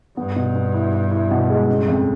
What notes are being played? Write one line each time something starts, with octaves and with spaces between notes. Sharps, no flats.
G2 B3
B2
B3
E4
E4
E4
B2
G#3
G2 C#3
F2